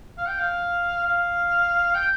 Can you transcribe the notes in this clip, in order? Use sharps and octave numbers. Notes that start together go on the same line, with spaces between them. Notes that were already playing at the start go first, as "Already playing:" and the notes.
F5
G5
F5
F5
G5